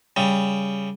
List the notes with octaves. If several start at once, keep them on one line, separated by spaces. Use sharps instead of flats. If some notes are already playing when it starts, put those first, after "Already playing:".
C#3 G3